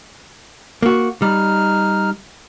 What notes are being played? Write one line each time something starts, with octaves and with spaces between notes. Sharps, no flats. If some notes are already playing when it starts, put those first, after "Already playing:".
A#3 F#4
G3 D#4 F6